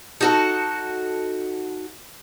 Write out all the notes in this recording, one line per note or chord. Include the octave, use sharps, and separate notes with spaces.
D#4 F#4 A4